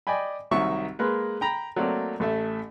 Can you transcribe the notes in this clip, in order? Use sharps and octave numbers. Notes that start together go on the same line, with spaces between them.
D5 D#5 G5 G#5 B5
C2 D#3 F#3 E5 C#6
G#3 A#3 B4
G5 A#5 B5
F#3 A3 A#3 C4 D5
A1 A3 E5